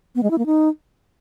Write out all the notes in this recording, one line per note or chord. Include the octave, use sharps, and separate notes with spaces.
B3
G#3
E4
A#3
D#4